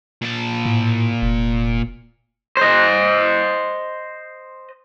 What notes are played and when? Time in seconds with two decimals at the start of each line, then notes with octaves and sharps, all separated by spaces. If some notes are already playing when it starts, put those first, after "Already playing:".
0.22 A#2 A5
0.66 A2
1.22 F1
2.57 C5 D#5